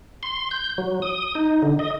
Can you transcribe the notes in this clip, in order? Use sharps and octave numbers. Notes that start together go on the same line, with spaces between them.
C6
G6
F#3
D#6
D#4
D3
D#5